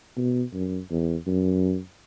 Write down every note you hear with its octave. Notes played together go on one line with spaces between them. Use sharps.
B2
F#2
E2
F#2